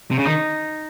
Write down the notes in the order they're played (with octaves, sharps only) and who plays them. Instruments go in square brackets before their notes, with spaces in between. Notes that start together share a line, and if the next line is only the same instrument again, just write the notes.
[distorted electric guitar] C3
C#3
[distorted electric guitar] D#3 [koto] D#4